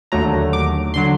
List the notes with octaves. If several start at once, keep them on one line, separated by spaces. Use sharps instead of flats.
D#2 D3 F#3 A3 A#5
D6
D3 F#3 C6